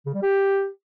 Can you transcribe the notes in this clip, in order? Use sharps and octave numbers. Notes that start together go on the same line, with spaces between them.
C#3
G3
G4